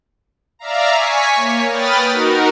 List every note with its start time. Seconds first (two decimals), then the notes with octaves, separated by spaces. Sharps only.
0.59 D5 E5 F5 A#5
0.91 G#5 C#6 B6
1.35 A#3 C#5
1.69 B4 G5 B5 D#6 F6 A6
2.09 D#4 F#4 A#4